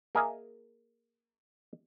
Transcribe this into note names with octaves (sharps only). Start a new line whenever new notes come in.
A#3 G#4 A#4 D#5 E5 G#5